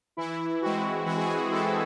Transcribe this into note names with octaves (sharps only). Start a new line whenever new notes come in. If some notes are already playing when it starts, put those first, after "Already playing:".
E3 E4
G#3 C4 E4 F#4
E3 F#4
G#4
F#4
G#3 C4 E4 A4